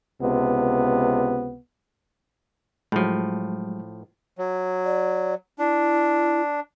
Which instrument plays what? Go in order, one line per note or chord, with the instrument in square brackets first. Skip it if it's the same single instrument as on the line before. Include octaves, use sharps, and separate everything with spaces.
[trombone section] C#2 C3 B3
[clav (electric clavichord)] A2 F3 [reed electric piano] F#3 G#3
[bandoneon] F#3
[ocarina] D5
[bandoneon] D4 [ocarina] E4